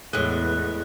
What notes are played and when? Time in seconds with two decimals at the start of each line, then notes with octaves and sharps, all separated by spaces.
0.13 E2 A2 G#3 B3 F#6